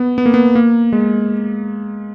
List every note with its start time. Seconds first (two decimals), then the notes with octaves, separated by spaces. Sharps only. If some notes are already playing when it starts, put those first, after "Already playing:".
Already playing: B3
0.18 B3
0.26 A#3
0.34 B3
0.55 A#3
0.93 G#3